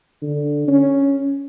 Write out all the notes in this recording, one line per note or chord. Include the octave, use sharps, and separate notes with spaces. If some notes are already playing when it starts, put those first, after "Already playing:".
D3
C#4